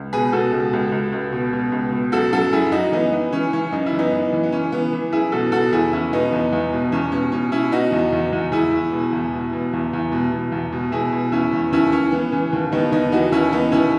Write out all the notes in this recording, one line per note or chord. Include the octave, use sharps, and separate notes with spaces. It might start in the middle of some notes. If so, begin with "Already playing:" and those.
Already playing: C#2
B2 G#4 B4
B2 F#4 A4
C#2
C#2
C#2
C#2
B2
B2
C#2
B2
F#2 F#4 A4
F#2 F#4 A4
F#2 E4 G#4
F#2 D#4 F#4
E3 B3 D#4
E3 B3
E3 C#4
E3 C#4
F#2 D#4
E4
E3
B3 D#4
F#2
E3
B3
E3 C#4
E3 B3
E3
F#2 E4 G#4
B2 F#4 A4
B2 F#4 A4
E2 E4 G#4
E2 C#4 E4
B2 B3 D#4
E2
E2
B2
E2 C#4
B2 C#4
B2 C#4
B2 C#4 E4
B2 D#4 F#4
E2
E2
E2
E2 E4 G#4
E2
B2
E2
B2
B2
E2
E2
B2
B2
E2
B2
B2 E4 G#4
B2
E2 C#4 E4
E2
D#2 C#4 E4
E3 C#4
E3 B3
E3 C#4
D#2
D#2 B3 D#4
D#2 B3 D#4
E3 D#4 F#4
D#2 C#4 E4
E3 B3 D#4
D#2 C#4 E4